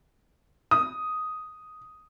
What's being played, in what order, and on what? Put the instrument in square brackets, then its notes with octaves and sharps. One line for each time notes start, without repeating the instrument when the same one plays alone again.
[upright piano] D#6